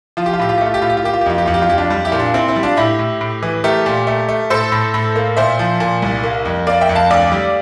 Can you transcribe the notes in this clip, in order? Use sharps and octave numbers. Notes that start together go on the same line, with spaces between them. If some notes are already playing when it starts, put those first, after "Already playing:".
F3 F4
G4
F4
A2 G4
F4
G4
A3
F4
G4
A2 F4
G4
F4
A#3 G4
F4
G4
F2 F4
G4
F2 F4
G4
F4
F2 G4
D4 F4
G3
E4 G4
A#2
D4 F4
A#2 C4 E4
C4 E4
G3
D4 F4
A2 E4 G4
A2
A2
E3
A3 G4 A#4
A#2
A3
A3
A2 A4 C5
A2
A2
A#3
A#2 C5 E5
F3
A#2
C2
A#3
F2
A#3 D5 F5
E5 G5
F2
F5 A5
D2 D5 F5
G3